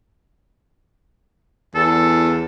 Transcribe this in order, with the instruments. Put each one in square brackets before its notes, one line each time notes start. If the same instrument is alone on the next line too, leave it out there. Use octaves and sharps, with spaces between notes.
[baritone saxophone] E2 [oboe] A4